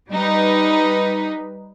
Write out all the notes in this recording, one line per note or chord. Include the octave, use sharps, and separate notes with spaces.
G3 D#4 B4